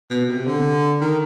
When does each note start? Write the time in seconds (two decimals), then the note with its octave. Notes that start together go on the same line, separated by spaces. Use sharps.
0.10 B2
0.29 C3
0.46 D3
1.01 D#3